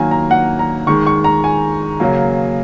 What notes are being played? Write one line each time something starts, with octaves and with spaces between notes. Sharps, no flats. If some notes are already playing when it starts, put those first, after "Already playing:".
Already playing: D#3 F#3 A#3 G#5
A#5
F#5
A#5
D#3 G#3 C#6
C#6
A#5
G#5
C#3 F#3 A#3